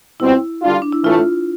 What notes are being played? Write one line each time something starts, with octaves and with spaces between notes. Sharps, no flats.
B2 G3 C4 E4 F4
D3 G3 D4 F4
D4
E4
A2 E3 A3 F4